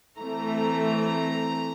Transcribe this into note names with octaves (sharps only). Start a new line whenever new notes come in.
E3 A3 C4 A#5